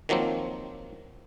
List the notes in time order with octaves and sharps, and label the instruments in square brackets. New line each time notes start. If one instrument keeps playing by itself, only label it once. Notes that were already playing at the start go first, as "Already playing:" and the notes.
[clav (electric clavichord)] D#3 F3 F#3 A#3 C4